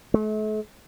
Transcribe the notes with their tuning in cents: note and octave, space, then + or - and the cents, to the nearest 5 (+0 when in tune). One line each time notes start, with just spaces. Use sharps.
A3 -40